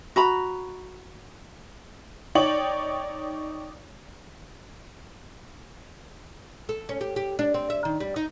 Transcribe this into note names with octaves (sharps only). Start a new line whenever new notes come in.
F#4 A#5 B5
D#4 C#5 D5 G5 F#7
A4
C#4
G4
G4
D4
C4
E5
D#3
G3
D#4